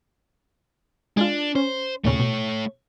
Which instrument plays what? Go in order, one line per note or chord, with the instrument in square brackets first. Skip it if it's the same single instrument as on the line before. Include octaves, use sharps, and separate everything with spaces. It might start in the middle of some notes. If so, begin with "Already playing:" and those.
[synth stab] G#3 F4 [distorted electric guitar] D4
[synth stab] C#4 [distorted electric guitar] C5
[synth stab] D#2 A#2 C#3 [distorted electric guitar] A3 C#5
[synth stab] B2